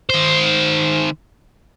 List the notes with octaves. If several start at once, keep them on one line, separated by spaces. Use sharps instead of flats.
D#3 C5